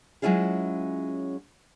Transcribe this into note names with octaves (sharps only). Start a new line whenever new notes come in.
F#3 G#3 C#4 E4 F4 G#4